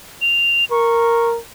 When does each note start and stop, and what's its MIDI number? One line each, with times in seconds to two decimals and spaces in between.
0.22 0.65 101
0.71 1.39 70
0.71 1.29 85